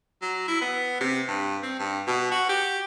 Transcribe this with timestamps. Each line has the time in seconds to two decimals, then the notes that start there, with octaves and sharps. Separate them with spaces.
0.22 F#3
0.48 E4
0.62 B3
1.01 C3
1.28 G2
1.63 C4
1.79 G2
2.07 B2
2.32 F#4
2.49 G4